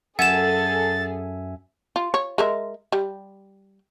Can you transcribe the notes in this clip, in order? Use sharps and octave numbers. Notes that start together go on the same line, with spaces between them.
F#2 G#4 A4 E5 F#5 G#5 A6 E7
F4
C#5
G#3 A#4 E5
G3